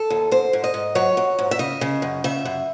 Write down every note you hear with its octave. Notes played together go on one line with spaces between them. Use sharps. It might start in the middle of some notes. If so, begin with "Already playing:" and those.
Already playing: A4
D#2
G#2 C5
G#2
D#5
G#2
F#3 C#5
F#3
G#2
E5
C#3 D#5
C#3
F#2
C#3 E5
F#2